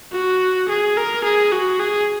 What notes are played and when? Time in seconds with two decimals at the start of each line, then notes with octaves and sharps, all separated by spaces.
0.12 F#4
0.69 G#4
0.97 A#4
1.24 G#4
1.52 F#4
1.80 G#4